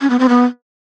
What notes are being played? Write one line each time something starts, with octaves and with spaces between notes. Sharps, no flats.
C#4
B3
C4
B3